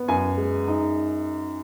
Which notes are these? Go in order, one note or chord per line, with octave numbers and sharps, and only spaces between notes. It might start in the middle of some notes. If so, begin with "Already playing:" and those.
Already playing: B3
F#2 G#5
G#3
D#4